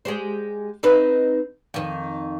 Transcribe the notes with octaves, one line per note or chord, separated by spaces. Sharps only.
G#3 G4 C5
C4 D#4 B4
F2 D#3